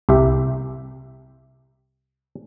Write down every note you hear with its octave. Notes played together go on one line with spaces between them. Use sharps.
C2 G4 E5